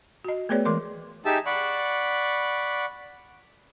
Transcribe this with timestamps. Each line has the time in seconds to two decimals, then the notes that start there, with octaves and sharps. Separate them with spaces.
0.24 F#4 D#5
0.49 A3 B3 G#4 B4 C#5 D5
0.65 E3 G#3 A#4 C6
1.25 D#4 G4 G#4 E5 A5 E6
1.46 D5 F#5 B5 C#6